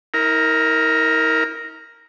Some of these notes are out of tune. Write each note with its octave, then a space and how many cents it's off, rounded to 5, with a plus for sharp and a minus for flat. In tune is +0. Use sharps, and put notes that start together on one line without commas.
E4 -45 A#4 +0